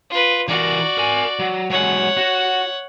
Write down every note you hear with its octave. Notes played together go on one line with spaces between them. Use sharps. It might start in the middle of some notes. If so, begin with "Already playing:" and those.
F4 B4
E3 F#4 A#4 D5
A#4 G#5
F#3
F#3 G#3 C#5 F#5
F#4